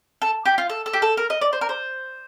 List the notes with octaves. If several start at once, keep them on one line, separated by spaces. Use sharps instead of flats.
A4
G4
F4
A4
A4
G4
A4
A#4
D#5
D5
C5
A#4
C5